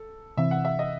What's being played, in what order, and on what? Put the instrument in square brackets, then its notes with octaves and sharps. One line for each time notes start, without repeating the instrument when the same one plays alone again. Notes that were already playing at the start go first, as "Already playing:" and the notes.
Already playing: [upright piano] A4
[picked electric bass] C3 E3 C4 [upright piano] E5
[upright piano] F#5
E5
D#5